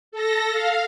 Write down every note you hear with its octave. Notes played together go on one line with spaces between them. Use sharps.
A4 A#6
F5